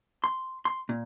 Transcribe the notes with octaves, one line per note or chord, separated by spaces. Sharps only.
C6
C6
A#2